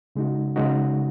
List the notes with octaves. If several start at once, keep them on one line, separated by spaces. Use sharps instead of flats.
C#3 G#3 D#4 F#4
C#3 G#3 D#4 F#4